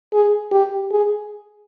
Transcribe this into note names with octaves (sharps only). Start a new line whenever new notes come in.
G#4
G4
G#4